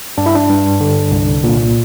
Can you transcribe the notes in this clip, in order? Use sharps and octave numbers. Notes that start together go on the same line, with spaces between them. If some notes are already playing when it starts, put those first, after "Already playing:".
G2 D4
E4
D4
G2
D3
C2
A#2